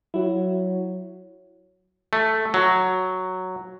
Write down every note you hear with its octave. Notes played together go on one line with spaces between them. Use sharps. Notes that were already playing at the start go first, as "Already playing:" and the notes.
F#3 E4 F#4
A3
F#3